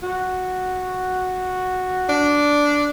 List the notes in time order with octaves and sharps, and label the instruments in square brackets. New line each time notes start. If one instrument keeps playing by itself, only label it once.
[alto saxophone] F#4
[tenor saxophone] D4